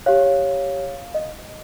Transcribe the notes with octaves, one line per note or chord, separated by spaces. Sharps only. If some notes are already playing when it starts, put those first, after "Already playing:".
G4 C#5 F5
D#5